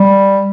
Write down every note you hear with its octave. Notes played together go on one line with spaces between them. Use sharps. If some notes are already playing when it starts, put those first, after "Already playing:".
Already playing: G3